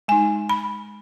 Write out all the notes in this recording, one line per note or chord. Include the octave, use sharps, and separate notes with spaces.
G#3 D#4 G#5
B5